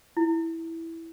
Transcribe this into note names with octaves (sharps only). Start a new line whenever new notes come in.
E4